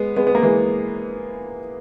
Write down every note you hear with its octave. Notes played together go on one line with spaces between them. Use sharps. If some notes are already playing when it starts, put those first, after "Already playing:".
Already playing: G#3 B3
G#3 B3
B3
A#3
E3 G#3